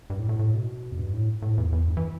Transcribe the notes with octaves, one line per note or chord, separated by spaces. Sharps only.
G2
A2
A2
A2
B2
E2
G2
A2
A2
E2
E2
G2
E3